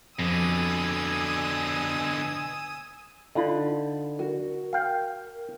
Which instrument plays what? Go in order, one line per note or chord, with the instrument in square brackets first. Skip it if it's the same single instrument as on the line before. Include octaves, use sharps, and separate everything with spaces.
[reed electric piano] F2 [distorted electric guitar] B2 D3 [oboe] G#5 [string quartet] D#6 E6
[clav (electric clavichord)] D3 [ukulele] D#4 F4 B5
[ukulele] F#4 [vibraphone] A#4
[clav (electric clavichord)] F5 G5